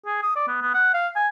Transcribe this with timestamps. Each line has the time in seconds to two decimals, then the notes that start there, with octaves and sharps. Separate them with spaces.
0.06 G#4
0.22 D#6
0.35 D5
0.47 B3
0.62 B3
0.74 F#5
0.93 F5
1.15 G#5